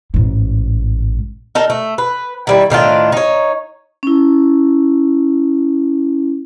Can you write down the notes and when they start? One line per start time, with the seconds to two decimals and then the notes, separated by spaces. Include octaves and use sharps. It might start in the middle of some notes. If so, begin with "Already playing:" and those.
0.14 A1 G#2
1.55 D#4 A4 A#4
1.70 A3
1.98 B4
2.47 D#3 G3 E4
2.70 A2 D#3 D4 F4
3.12 D#4 C#5
4.03 C#4 E4